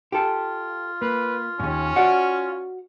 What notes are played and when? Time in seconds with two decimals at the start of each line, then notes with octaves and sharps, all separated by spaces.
0.12 F4 G4 A4
1.02 A#3 B4
1.60 D#2 G#2 C#4
1.96 F#4 D5 F#5